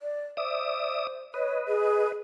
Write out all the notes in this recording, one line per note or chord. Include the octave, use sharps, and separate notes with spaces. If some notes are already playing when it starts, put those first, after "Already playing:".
D5
C5 D5 E5 D#6
B4 C#5 D#5
G#4